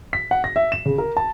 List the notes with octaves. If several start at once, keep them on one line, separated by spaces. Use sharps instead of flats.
B6
F#5
A#6
E5
E7
C#3
A#4
A5